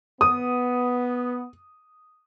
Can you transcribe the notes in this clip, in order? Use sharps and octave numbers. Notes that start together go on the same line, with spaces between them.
B3 D#6